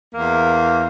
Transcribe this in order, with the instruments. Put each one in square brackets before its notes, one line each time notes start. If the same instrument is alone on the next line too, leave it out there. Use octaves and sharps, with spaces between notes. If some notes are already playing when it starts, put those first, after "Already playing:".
[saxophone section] E2 A#3